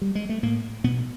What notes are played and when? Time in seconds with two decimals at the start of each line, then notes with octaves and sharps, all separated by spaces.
0.01 G3
0.15 G#3
0.29 A3
0.43 A2 A#3
0.84 B2 B3